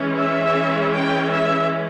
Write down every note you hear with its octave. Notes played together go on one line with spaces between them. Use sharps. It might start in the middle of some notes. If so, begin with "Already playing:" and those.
Already playing: E3 G#3 C#4
E5
G5
E5